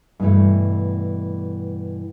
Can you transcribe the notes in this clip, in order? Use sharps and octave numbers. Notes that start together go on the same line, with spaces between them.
G2 B2 E3 A3